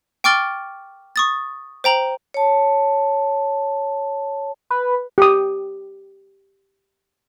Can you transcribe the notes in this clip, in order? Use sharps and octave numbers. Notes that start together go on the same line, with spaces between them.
G5 C#6 D6 F6 A6 G7
C#6 D#6 A6
C5 G5 A#5 F#7
C#5 A5
B4
G4 D#6